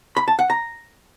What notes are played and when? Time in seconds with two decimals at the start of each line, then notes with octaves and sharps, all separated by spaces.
0.17 B5
0.28 A5
0.39 F#5
0.50 A#5